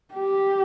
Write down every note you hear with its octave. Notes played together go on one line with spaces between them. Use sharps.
G4